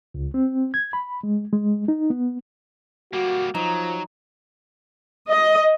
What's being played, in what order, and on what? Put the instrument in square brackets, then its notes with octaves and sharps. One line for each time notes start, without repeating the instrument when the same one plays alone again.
[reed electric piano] C#2
C4
G#6
B5
G#3
G#3
D#4
B3
[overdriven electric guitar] G3 A#3 [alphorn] F#4
[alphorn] F3 [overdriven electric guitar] F#3 [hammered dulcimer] D#4
[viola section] D#5